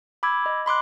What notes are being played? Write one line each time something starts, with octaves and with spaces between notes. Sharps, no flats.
B5 D6 E6 G#6
D#5
B5 C6 D6 F#6